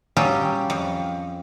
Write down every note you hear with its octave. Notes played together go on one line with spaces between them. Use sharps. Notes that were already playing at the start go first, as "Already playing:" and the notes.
F#3 G3 C#4 F4 G4 G#4
F2